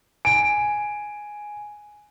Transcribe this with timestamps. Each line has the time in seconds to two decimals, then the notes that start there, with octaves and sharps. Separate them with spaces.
0.25 G#5 D7